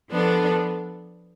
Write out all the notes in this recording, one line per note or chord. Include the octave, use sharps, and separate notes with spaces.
F3 B3 D4 A4